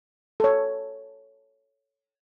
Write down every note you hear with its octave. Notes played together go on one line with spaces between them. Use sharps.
A4 C#5